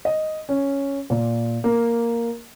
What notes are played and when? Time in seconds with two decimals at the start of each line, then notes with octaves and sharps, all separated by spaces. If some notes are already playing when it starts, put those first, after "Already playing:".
0.05 D#5
0.49 C#4
1.10 A#2
1.64 A#3